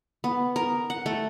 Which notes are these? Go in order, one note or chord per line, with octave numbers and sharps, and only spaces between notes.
B3
A#4
F#5
A3